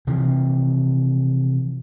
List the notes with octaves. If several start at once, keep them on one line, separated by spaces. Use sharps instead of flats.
C3 E3 F3